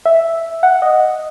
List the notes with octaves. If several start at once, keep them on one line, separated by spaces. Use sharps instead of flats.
E5
F#5
D#5